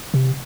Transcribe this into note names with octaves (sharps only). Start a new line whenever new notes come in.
C3